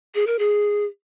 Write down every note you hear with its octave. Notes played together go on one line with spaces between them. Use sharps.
G#4
A#4
G#4